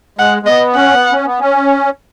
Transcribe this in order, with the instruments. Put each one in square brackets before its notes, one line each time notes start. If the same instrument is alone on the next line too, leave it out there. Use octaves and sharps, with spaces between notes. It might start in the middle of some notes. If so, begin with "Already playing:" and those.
[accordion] G#3 [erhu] F#5
[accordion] G#3
[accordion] B3 [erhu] D#5
[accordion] C#4 [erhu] F#5
[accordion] B3
C#4
B3
C#4